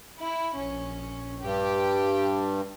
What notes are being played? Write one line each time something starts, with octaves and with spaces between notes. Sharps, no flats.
E4
A#1 C#4
G2 G4